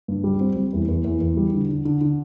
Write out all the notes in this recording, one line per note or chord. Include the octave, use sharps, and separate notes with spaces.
G2
G3
C4
G3
E2
E2
E2
E2
G3
D3
D3
D3
D3